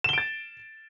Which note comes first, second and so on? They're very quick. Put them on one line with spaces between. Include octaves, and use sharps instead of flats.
E7 G7 D7 A6